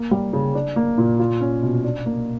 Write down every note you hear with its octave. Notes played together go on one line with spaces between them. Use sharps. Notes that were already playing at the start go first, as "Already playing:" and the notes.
Already playing: A#3
G3
C#3
D4
A#3
A#2
F4
C#4
B2
D4
A#3